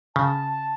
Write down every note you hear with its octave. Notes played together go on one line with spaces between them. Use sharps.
C#3 A5